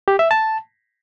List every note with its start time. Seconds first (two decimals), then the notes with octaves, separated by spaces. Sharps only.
0.08 G4
0.19 E5
0.31 A5